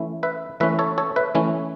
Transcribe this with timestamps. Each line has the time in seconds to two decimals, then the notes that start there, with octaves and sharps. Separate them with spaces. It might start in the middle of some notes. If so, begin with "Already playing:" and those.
Already playing: E3 A3 C#4 E4
0.23 B4 E5
0.60 E3 A3 C#4 E4 B4 E5
0.79 A4 C#5
0.98 A4 C#5
1.16 B4 E5
1.35 E3 A3 C#4 E4